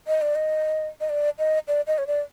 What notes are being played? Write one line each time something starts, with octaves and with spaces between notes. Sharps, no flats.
D#5
D5
D#5
D#5
D5
D#5
D5
D#5
C#5
D5